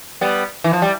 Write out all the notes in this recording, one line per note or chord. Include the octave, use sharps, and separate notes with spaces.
G3 B3
E3
F3
G3